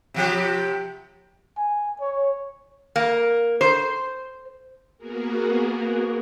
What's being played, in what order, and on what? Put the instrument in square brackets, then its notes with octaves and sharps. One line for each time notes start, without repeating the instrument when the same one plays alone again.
[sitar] C3 F3 G4
[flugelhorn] G#5
C#5
[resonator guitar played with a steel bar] A#3
C5
[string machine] A#3 B3 F#4 G#4 A#4